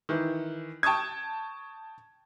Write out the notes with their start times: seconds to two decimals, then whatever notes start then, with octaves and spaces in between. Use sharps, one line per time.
0.09 D#3 E3
0.83 G5 A5 C#6 D#6 G#6